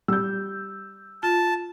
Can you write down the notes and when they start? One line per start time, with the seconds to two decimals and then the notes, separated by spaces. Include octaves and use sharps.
0.08 G3 E6 G6
1.23 F4 A5